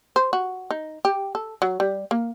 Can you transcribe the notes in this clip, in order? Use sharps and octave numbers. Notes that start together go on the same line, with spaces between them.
C5
F#4
D#4
G4
A4
F#3
G3
A#3